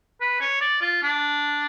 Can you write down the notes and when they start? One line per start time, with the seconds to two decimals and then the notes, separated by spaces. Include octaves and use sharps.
0.21 B4
0.40 C#5
0.61 D5
0.81 F4
1.03 D4